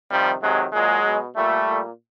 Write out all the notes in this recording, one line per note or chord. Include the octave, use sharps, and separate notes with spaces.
C3 D#3 F3 G3
C3 D#3 F#3 G#3
A#2 F#3 G#3
B2
A#2 G3 A3
A#2